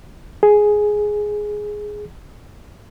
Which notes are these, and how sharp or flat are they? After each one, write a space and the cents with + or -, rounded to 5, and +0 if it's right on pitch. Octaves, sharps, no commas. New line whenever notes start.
G#4 +5